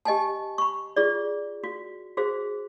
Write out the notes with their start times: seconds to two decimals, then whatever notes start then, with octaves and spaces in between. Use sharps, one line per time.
0.05 G4 D#5 G#5 A5
0.58 B5 C#6
0.96 F4 G#4 D5
1.64 F#4
2.17 F#4 G#4 C5